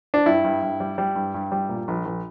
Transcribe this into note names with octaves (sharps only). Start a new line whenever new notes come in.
D4
G2 E4
G2
G2
G3
G3
G2
G2
G3
A#2
A#1
A#1